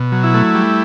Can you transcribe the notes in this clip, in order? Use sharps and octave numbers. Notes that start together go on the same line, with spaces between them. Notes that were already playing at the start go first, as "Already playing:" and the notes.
Already playing: B2
F#3
E4
A3
G3